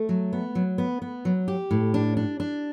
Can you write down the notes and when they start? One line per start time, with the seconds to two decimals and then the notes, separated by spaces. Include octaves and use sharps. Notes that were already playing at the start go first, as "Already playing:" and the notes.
Already playing: A3
0.09 F#3
0.33 B3
0.55 F#3
0.78 B3
1.02 B3
1.25 F#3
1.48 G4
1.71 A2
1.94 D4
2.17 D4
2.40 D4